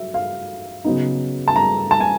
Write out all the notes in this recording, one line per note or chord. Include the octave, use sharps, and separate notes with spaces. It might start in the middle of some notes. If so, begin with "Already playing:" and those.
Already playing: F#3 E5
F5
C#3 F#3 B3 D#4
A5
A#5
A5
G#5